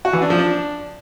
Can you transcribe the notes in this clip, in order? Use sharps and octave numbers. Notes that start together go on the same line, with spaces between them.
F#4
E3
D4
F3
D4